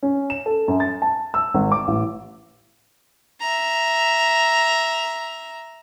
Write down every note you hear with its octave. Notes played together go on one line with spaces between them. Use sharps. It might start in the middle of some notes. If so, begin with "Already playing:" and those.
C#4
E7
A4
F#2
A6
A5
E6
G#1
D6
A1
E5 A#5